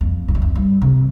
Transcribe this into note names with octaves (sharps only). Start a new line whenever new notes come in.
F2
F2
E2
F2
G2
C3